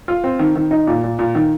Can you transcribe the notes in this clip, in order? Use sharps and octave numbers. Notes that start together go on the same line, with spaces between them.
F4
C4
D#3
D#3
D#4
A#2
A#2
A#2
D#3